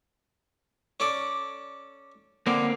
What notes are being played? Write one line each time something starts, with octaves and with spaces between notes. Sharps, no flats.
C#4 A4 D5
D3 A#3 C4